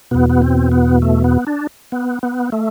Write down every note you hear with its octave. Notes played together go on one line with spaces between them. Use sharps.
E2 B2 B3
B3
C4
B3
A3
B3
D4
B3
B3
A3